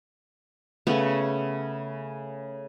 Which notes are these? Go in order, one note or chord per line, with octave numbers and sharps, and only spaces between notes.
C#3 A3 B3 C#4